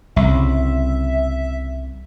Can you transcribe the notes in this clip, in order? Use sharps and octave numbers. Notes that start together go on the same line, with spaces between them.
C2 C#3 E5